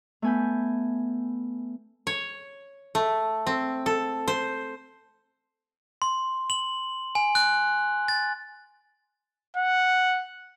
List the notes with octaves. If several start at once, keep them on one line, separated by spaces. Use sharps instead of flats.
A3 B3 G#5 B5 G6
C#5
A3
C4
A4
C5
C6
F#7
G#5
F#6
A6
F#5